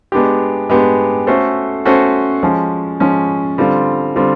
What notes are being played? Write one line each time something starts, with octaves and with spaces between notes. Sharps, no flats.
G#3 B3 D4 G4
G#3 B3 D4 G4
A3 C#4 F#4 A4 C5
A3 C#4 F#4 A4 C5
F3 G#3 C#4
F3 G#3 C#4
D3 G3 C4 F4
D3 G3 C4 F4